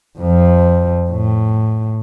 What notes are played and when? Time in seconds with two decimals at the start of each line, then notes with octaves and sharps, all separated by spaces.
0.19 F2 F3
1.10 A2